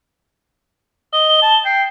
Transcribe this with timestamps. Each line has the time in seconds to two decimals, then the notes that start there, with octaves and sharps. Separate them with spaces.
1.13 D#5 G7
1.42 A5
1.65 G5 C7